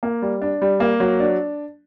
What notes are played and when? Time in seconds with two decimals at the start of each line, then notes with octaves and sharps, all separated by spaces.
0.03 A#3
0.22 G3
0.42 D4
0.62 G3
0.80 A#3
1.00 F#3
1.20 D4